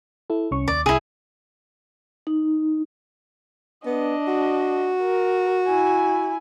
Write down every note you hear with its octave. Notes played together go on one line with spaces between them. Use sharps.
E4 A4
C2 C#4 C#6
D#2 D5
C2 E4 G#4
D#4
B3 D4 D#5
F#4
A#4
E4 G#5